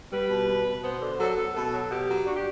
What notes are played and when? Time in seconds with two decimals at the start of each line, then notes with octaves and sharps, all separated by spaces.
0.11 G3 B4
0.29 B2
0.47 B2
0.65 B2
0.83 B3 C5
1.01 D3
1.19 F#3 A4
1.36 B3
1.55 B2 A4
1.73 F#3
1.90 B2 G4
2.09 F#3
2.26 D4 F#4
2.36 G4